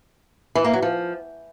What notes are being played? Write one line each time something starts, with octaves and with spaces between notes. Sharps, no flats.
E3
A#3
F#3
F3